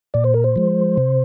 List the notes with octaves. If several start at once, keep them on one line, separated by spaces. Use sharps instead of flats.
A#2 D5
C5
A#4
C5
F3 G#3
C3